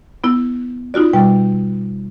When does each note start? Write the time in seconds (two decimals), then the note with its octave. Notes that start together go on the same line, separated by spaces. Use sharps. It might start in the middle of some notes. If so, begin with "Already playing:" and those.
0.24 B3 E4
0.94 D#4 F4 F#4 D5
1.13 B2 G3 G5